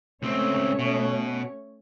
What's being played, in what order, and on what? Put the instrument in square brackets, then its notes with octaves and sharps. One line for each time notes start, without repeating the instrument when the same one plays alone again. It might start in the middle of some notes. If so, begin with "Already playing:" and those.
[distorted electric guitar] C#2 C4 [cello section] A3 C#4 C#5
[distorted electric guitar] B2